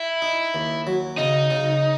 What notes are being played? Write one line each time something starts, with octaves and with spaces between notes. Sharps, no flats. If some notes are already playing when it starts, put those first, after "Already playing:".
Already playing: E4
D#4
D#2
F#3
C#3 D#4
C#3